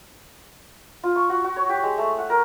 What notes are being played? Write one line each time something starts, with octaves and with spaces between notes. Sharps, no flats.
F4
C#6
F#4
F#4
C#5
G4
G#3
A3
F#5
A#4